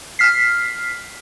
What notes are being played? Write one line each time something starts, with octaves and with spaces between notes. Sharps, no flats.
F6 B6 C7